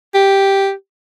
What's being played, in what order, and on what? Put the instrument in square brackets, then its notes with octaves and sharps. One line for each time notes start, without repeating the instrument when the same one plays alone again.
[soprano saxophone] G4